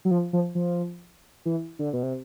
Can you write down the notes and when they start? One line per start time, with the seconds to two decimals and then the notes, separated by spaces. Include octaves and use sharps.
0.05 F#3
0.11 F3
0.33 F3
0.55 F3
1.45 E3
1.79 D3
1.93 B2
2.03 C3